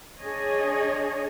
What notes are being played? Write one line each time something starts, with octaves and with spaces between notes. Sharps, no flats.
D4 G#4 C#5 D#5